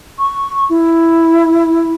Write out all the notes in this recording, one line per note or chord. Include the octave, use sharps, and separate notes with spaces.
C#6
E4